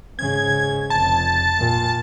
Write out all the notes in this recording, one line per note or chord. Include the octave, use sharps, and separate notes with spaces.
G#2 C#3 G#6
F1 A5
A#2